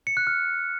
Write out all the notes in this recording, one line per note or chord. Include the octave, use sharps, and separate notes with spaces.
C#7
F#6
F6